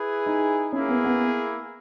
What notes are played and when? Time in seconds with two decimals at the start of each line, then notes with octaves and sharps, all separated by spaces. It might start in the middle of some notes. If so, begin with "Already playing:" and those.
Already playing: E4 G#4 B4
0.26 D#4
0.72 A#3 C#4 E4 G#4
0.89 B3
1.05 B3